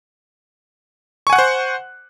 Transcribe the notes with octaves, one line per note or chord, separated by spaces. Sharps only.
C5 F#5 G#5 C#6 F#6